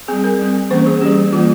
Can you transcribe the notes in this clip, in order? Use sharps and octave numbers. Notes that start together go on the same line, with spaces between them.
G3 C4 G#4
A#4
G3 C4
E3 A#3 C#4 C5
G#4
G3 C#4 G4
E3 G3 A#3 F4